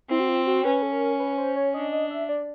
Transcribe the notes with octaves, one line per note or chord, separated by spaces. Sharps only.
C4 E4
F#4
F4
F#4
C#4 B4
A4
A#4
B4
C5
C#5
D4 D#5
D#5
E5
D5